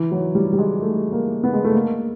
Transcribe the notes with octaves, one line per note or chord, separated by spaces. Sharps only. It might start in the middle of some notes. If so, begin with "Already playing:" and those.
Already playing: E3
F#3
G3
G3
G#3
A3
A#3
B3
G#3
A3
A#3